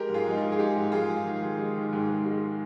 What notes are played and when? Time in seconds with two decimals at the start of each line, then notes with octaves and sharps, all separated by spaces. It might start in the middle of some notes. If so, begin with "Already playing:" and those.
Already playing: G#3 G4 A#4
0.09 G#2
0.14 F4 G#4
0.26 G#2 D#4
0.37 G#2 F4
0.52 G#4
0.59 G#3 D#4 G4
0.76 G#2
0.92 G#2 F4 G#4
1.10 G#2
1.26 D#3
1.42 G#2
1.58 G#3
1.76 D#3
1.93 G#2
2.09 G#2
2.26 G#3